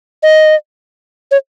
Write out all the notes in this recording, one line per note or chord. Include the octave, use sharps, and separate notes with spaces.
D#5
C#5